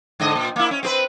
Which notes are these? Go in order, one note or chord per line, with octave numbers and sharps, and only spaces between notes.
G#2 D3 D#5
A#2
A#3 E4
C#4
C4 G4 B4